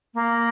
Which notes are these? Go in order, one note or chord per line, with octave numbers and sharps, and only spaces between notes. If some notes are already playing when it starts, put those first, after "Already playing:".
A#3